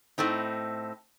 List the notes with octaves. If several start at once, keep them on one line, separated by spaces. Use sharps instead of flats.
A2 A3 C4 D#4